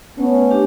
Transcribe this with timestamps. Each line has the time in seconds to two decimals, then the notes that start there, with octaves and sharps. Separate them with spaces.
0.18 A3 B3 C#4
0.51 D4 G4